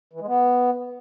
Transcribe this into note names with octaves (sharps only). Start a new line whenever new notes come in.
E3
G#3
B3